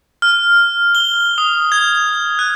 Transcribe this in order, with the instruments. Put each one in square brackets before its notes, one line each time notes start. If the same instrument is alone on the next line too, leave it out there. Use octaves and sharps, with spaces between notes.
[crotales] F6
G7
D#6
G#6
F#6